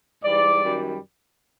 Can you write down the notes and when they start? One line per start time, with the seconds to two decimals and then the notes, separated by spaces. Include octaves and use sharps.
0.24 G#2 E3 G3 D5
0.63 F#2 D#3 G3